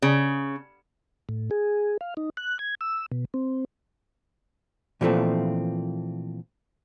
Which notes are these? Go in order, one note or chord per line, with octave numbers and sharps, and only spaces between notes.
C#3
A2
G#4
F5
D#4
F#6
G#6
E6
B2
C4
A#2 E3 F3 G3 A3 C4